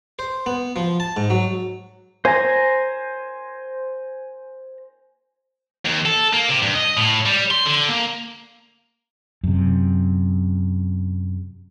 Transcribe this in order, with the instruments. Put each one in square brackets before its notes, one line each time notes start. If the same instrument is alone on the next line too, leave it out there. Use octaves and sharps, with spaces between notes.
[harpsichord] C5
B3
F3
A5
G#2
F#3
[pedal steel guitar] C5 A#5 [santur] G#5
[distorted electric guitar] D#2
A4
A#3
C3
G2
D#5
A2
G3
C6
D3
A#3
[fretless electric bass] F#2 C3